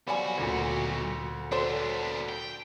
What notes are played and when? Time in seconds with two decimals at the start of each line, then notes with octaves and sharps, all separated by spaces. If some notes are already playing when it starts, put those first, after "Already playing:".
0.08 B1 F3 G3 F#4 G#5 B5
0.37 D2 A#2
1.52 F#3 B3 D4 A4 C5
2.29 G5